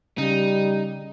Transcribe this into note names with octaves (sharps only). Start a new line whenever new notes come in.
C#3 G3 D#4